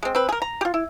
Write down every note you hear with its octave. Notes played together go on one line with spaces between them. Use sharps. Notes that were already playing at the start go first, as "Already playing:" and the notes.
G#3 C4
C4 B4
G#4 A#4
A#5
F4 G4
E4